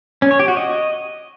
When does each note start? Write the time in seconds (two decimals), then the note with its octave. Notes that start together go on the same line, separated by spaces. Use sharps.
0.22 C#4
0.31 C#5
0.39 G4
0.48 F#4
0.57 D#5